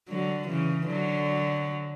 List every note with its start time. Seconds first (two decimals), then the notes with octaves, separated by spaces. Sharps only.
0.09 D3 F#3
0.48 C#3 E3
0.87 D3 F#3